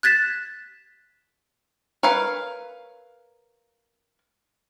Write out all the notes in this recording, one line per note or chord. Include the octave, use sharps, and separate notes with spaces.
F#6 G#6 A6 B6 E7
A#4 B4 C#5 F5 B5